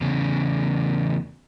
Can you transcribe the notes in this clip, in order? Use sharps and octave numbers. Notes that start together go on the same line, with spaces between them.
E2 C#3